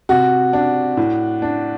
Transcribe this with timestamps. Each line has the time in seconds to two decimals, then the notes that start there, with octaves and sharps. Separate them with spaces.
0.09 C3 F#4
0.53 D4
0.97 A2
1.42 D4